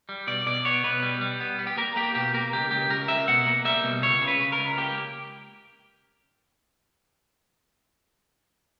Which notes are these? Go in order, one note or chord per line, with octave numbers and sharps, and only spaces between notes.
G3
B2 D5
B2 D5
B3 C#5
B2 B4
G3
G3
B3
B3
G4
A#3 A#4
A#3 G4
B2 G4
A#3 A#4
C#2 G4
C#2 G4
C#2 A#4
C#2 E5
B2 F#5
A#3
G3 E5
B2
C#2 C#5
C#3
B4
C#3
A#4
C#2
A#3 G4